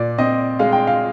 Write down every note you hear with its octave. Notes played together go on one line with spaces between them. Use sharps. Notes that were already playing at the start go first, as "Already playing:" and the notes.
Already playing: A#2 D5
C4 D#5
G#3 F5
G5
F5